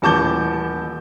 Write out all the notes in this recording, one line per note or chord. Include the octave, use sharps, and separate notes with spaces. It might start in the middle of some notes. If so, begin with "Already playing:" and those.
D#1 A1 A5 D6 G6 G7